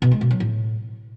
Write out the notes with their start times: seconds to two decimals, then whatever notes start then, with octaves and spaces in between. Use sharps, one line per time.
0.02 B2
0.11 G#3
0.21 B2
0.31 F#3
0.40 A2